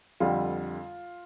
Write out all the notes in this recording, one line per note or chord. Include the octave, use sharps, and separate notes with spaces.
F2 D3 G3 F4